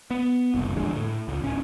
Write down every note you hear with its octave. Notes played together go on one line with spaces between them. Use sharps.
B3
F#1 C2
A1 F2 D3 G#3
A2
C#2
D1 C#4